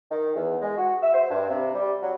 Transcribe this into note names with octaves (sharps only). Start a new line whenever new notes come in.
D#3
E2
G#3
F#4
E5
C5
G2
C3
G3
F#3